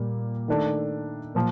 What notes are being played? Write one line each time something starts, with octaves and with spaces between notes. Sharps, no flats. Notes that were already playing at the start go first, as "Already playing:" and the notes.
Already playing: A#2 G3 A#3
D#3 A3 D4
A#2 F3